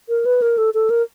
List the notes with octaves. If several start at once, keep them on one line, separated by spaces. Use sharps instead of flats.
A#4
B4
A#4
A4
A4
A#4